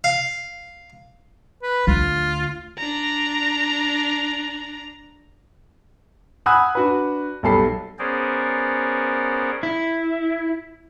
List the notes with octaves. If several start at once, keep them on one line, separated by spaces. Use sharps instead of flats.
F5
B4
D2 F4
D4 A#5
F#5 G#5 B5 D#6 E6 F#6
D4 F#4 B4
B1 G3 A4 B5 C7
B3 C#4 G#4 A#4 C5 D5
E4